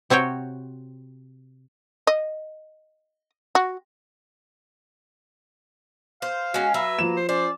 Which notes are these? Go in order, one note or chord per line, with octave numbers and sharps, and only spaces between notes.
C3 C4 F#4 C#5 G5
D#5
F#4
C5 F5
G#3 C#4 F#4
F#3 B4 E5
F3 A#3 E7
C5
C#4 C5 D5